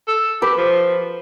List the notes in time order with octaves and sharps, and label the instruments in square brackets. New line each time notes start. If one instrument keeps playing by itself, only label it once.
[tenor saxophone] A4
[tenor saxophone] G4 [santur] B4
[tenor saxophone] F3